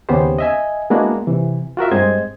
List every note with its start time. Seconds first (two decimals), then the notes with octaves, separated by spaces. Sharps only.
0.09 D#2 C#3 B3 C#4 G4 C5
0.39 D#5 E5 G#5
0.90 G#3 A#3 B3 D4 E4 F#4
1.27 C3 E3
1.77 F4 F#4 A#4 E5
1.92 G2 G#3 C4 C5 D#5 G#6